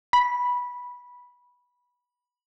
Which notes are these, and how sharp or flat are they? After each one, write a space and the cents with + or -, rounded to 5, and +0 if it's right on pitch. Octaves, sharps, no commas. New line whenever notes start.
B5 -15